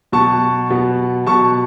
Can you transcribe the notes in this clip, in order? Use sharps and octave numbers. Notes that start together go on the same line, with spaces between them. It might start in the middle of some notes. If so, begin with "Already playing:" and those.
B2 F#3 B3 A5 C#6
B2 F#3 B3
B2 F#3 B3 A5 C#6